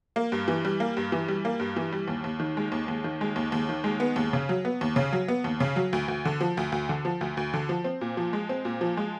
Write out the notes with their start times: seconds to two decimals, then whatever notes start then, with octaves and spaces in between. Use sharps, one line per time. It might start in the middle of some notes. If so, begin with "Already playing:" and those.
0.16 A#3
0.32 G2
0.48 E3
0.65 G3
0.80 A#3
0.97 G2
1.12 E3
1.28 G3
1.45 A#3
1.60 G2
1.77 E3
1.92 G3
2.08 D#2
2.24 D#2
2.40 D#3
2.57 G#3
2.72 D#2
2.88 D#2
3.04 D#3
3.21 G#3
3.36 D#2
3.52 D#2
3.69 D#3
3.84 G#3
4.00 B3
4.16 D#2
4.33 C#3
4.49 F#3
4.65 B3
4.81 D#2
4.96 C#3
5.13 F#3
5.28 B3
5.44 D#2
5.60 C#3
5.76 F#3
5.93 D2
6.08 D2
6.25 D3
6.41 F3
6.57 D2
6.72 D2
6.89 D3
7.05 F3
7.21 D2
7.37 D2
7.54 D3
7.69 F3
7.84 C4
8.01 A#2
8.17 F3
8.33 G#3
8.49 C4
8.65 A#2
8.81 F3
8.97 G#3